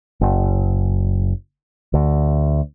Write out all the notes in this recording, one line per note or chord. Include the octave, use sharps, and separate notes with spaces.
F#1
D2